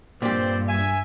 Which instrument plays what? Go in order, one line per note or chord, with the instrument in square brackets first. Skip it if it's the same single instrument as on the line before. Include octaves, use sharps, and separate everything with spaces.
[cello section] G2 [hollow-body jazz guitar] A#2 G4 [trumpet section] C4 C5 D5
[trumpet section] E5 G#5